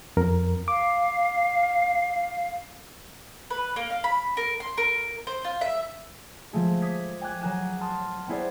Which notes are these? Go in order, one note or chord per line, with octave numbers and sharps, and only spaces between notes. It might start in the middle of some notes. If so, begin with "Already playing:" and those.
F2 A#4
F5 D6
B4
A#3
F5
B5
A#4
C6
A#4
C5
F4
E5
F3 G#3 A3 G#4
D6 D#6 G#6 B6
G5 G#5 D6 F#6 G#6
F#3 G#4 A#4 G#5 F#6 E7
A5 C6 D#6 F6
B3 C4 E4 G#4 C5 D5